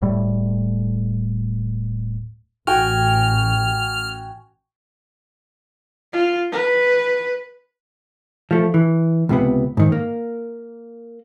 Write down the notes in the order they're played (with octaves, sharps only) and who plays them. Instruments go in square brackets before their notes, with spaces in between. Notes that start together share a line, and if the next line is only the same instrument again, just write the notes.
[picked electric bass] D1 A2 G3 A3
[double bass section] A1 [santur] F#4 G5 G#5 [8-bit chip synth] F6
[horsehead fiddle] F4
B4
[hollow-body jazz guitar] F3 A3
E3
C#2 C3 B3
G#2 D#3
A#3